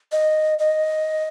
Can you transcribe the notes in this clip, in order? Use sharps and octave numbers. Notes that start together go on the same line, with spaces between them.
D#5
D#5